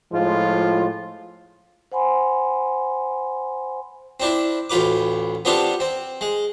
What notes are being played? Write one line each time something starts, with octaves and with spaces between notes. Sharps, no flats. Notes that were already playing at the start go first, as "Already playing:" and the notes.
A2 F3 G#3 F4
C5 F#5 G#5 B5 C6
C4 D4 E4
A1 D2 F4 B4 D6
B3 C4 D4 F4 G4 A4
C4
G#3